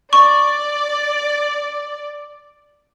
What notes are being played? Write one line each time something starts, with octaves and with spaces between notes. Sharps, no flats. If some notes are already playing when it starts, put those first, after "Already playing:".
D5 C#6